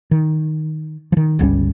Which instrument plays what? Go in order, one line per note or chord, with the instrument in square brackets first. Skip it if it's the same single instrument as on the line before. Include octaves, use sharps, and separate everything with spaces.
[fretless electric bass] D#3
D#3 F3
G1 C#2 G3 C#4